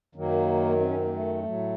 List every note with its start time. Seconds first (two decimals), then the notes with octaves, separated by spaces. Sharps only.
0.15 F#2 D#3 F#3 A#3
0.80 C4
0.88 C#4
0.96 C4
1.04 A#3
1.12 A3
1.44 A2 F#3